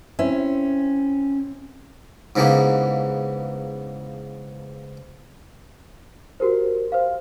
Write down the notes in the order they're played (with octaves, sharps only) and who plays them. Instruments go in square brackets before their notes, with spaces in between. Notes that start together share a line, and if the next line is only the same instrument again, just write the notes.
[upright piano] C4 E4 E5 [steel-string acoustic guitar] C#4
[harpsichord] G#2 C#3 E3 A#3 B3 G4
[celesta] F#4 G4 A#4 C5
C5 F5